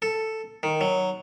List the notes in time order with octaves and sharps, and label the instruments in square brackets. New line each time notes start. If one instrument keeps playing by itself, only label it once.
[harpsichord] A4
D#3
F#3